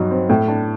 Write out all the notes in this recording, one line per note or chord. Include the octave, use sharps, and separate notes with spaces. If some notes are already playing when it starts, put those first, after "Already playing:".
Already playing: G2 F#3 D#4
C4
A2
D4